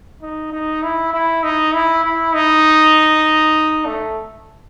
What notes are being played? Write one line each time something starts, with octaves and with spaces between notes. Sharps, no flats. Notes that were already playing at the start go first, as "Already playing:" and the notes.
D#4
D#4
E4
E4
D#4
E4
E4
D#4
A3